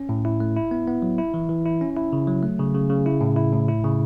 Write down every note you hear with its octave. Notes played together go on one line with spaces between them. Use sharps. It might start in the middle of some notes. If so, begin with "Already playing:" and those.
Already playing: C#4
A2
E4
A3
E4
B3
B3
F#3
E4
E3
E3
E4
C#4
E4
C#3
F#3
A3
C#3
C#3
C#3
E4
A2
E4
A2
E4
C#3